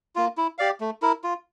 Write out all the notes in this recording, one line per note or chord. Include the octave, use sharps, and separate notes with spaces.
A#3 F4
E4
G4 D5 F5
A3
E4 A#4
F4